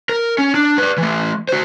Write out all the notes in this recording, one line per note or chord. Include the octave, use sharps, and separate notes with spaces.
A#4
C#4
D4
B4 D5
E3 A3
F#4 C5